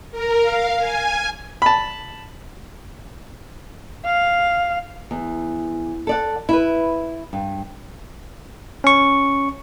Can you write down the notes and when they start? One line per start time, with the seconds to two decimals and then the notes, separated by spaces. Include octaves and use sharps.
0.11 A#4
0.41 F5
0.78 G#5
1.62 A5 B5
4.05 F5
5.11 E2
6.07 A4 D5 F#5
6.49 E4 B4
7.33 G2
8.84 C#4 C#6